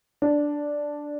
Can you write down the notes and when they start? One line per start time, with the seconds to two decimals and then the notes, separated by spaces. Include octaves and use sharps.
0.22 D4